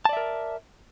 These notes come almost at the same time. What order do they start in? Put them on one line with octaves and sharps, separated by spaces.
A5 D5 E5 A#4